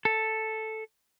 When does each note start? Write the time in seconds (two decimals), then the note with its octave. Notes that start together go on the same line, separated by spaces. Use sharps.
0.05 A4